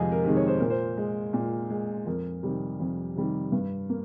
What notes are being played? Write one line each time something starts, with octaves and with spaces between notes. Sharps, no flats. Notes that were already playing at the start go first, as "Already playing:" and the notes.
Already playing: F2 C3 D#3 G#3 G#4 D#5 F5
A#4
C3 D#3 G#3
C#5
C5
A#2 A#4
C5
G#3
A#2
G#3
F2 A#4
C3 D#3 G3
F2
C3 D#3 G3
G2
A#3